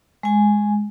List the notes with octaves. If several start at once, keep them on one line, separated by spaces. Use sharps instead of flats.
G#3 G#5